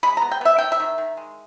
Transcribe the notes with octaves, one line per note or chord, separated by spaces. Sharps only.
G#3 B5
A#5
B3
G5
B3 E5
D#3 G5
E5
D#3
D#3
G#3